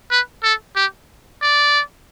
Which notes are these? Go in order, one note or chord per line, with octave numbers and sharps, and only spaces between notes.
B4
A4
G4
D5